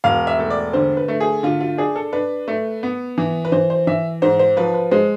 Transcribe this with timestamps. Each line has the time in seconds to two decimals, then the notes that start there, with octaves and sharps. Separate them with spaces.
0.04 E1 F5
0.27 E5
0.39 A3
0.50 D5
0.73 D3 C5
0.97 B4
1.08 A3
1.20 G#4
1.43 D3 F4
1.60 F4
1.78 D4 G#4
1.96 A4
2.13 D4 B4
2.48 A3
2.83 B3
3.18 E3
3.45 B4
3.52 E3 C5
3.70 C5
3.87 E3 E5
4.22 G#2 C5
4.39 C5
4.57 F3 B4
4.74 B4
4.91 G#3 C5